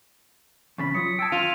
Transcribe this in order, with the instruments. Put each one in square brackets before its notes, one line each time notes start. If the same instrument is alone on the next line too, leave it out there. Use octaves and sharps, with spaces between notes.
[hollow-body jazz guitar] E2 C#3 B5 [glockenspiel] C#6 A6 B6
[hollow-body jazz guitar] F#3 F4 [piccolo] D#6 [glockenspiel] C#7
[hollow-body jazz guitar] G5 A5 [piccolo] E6 [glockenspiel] G#6 A6 D7
[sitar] F4 [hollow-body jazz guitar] F5 [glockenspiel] D#7 [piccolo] F7